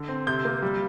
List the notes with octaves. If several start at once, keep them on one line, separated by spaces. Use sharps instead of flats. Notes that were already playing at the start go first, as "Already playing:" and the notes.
Already playing: D3
C4
C3 G6
A#3
G3